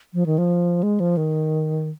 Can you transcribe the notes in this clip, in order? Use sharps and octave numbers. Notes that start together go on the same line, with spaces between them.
F3
D#3
F3
G#3
F3
D#3